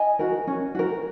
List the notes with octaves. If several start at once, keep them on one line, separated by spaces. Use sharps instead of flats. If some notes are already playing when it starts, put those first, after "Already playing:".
Already playing: D#5 G#5
F#4 A#4
C#4
F#4 A#4